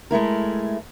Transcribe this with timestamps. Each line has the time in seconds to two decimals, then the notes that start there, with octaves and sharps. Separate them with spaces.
0.11 G#3 A3 E4 A#4